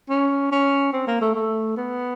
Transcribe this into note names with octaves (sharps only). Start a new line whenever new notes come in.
C#4
C#4
C4
A#3
A3
A3
B3